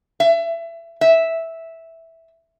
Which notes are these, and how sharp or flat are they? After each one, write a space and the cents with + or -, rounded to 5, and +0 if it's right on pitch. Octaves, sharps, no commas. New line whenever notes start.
E5 +25
E5 -5